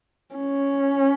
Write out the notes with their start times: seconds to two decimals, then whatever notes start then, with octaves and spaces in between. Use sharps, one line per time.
0.35 C#4